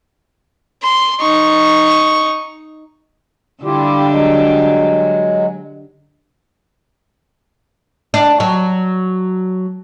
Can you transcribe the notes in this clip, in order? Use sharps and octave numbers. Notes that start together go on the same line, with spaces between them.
C6
D#4 C#6
D3 G3 D4 E4 F4 G4
F#3 G#3
D4
F#3